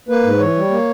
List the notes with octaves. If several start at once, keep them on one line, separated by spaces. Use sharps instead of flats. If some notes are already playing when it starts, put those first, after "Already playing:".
A#3 B4
G#2
E3 C#5
G3
A#3